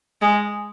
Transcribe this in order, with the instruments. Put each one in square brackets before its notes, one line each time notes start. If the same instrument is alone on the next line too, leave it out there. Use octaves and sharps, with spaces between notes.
[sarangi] G#3